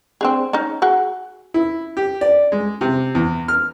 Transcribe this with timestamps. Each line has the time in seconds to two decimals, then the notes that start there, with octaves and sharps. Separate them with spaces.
0.21 C4 D4 G#4
0.53 C#4 D#4
0.82 F#4 G#4 F#5
1.54 E4
1.97 G4
2.21 D5
2.52 G#3
2.81 C3
3.15 E2
3.48 F6